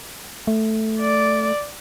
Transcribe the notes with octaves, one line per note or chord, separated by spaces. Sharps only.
A3
D5